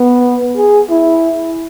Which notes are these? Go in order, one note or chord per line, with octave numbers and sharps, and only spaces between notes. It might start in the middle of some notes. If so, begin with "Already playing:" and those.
Already playing: B3
G#4
E4